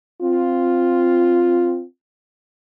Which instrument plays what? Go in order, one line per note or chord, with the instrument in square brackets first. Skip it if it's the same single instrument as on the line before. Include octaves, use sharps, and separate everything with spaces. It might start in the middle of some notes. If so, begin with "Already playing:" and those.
[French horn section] C4 F4